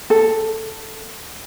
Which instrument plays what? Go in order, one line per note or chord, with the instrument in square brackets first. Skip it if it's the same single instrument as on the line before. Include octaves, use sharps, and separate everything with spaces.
[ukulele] A4